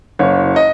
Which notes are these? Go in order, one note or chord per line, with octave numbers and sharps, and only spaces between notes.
F#1 C#5
D#5